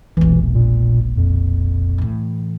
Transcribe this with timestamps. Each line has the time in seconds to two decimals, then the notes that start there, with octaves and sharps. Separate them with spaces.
0.17 E1 A#1 E3
0.55 A#2
1.17 F2
1.98 A2 E3